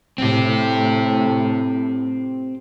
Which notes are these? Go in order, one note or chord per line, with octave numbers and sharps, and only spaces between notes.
A2 C4 G4